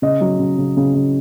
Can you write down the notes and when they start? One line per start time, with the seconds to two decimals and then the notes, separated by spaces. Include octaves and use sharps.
0.02 C#3 D#5
0.21 F#3
0.39 C#3
0.58 C#3
0.77 C#3
0.95 C#3